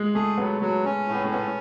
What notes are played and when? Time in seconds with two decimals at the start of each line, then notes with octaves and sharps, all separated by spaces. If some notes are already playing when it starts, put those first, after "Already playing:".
Already playing: G#3
0.14 A3 G#4
0.38 F#3 B3
0.61 F#3 A3
0.85 C#4
1.08 A2
1.15 B3
1.25 A3
1.31 B3 C#4